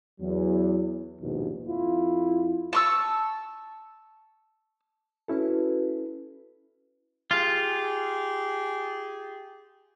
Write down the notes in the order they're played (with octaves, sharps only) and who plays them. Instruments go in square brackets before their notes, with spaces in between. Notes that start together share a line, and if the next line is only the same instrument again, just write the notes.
[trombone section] E2 F#3
A#1 D#2 G#2 B2
F2 E4 F4
[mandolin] A5 C#6 E6
[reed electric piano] C#4 E4 A4 [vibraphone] F#4 B4
[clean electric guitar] F4 [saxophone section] G4 G#4